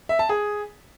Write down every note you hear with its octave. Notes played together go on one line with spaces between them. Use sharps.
E5
A5
G#4